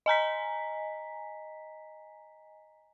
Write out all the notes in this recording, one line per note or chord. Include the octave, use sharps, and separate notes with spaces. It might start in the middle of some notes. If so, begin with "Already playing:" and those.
D#5 G#5 A#5 B6